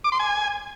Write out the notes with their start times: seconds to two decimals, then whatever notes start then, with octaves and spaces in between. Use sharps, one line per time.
0.04 D6
0.12 C6
0.20 G#5